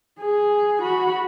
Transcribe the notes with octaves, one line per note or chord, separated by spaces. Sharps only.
G#4
F#4 B5